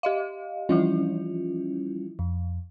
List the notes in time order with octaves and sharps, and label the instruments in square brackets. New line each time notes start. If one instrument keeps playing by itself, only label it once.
[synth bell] G4 D#5 F5
[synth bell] E3 F3 E4 [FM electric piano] G3 C#4 F4
[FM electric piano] F2